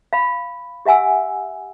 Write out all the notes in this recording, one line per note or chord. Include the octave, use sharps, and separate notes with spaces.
F5 B5
G4 E5 F#5 G#5 E6